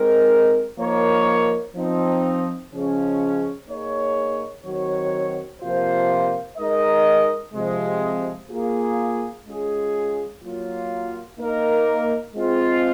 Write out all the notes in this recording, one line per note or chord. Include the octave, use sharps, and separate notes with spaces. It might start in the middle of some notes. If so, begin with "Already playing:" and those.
Already playing: G#3 C4 D#4 A#4
F3 A#3 D#4 A#4 C#5
F3 C4 D#4
C#3 F3 G#3 C#4 G#4
A#3 D#4 G#4 C#5
D#3 F#3 C4 F#4 C#5
C3 F3 A#3 F4 C5
G#3 D#4 A#4 D#5
C3 F3 G#3
A#3 F4 G#4
G#3 C#4 F4 G#4
F#3 A#3 F4
A#3 D#4 A#4
G#3 C4 F4